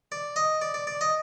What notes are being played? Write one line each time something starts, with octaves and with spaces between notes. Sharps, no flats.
D5
D#5
D5
D5
D5
D#5